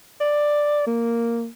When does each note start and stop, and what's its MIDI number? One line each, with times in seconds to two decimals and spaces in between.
0.21 0.86 74
0.87 1.48 58